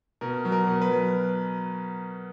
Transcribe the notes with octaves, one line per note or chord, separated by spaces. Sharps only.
B2 A#4
F#3
A#4
B2
B4
F#3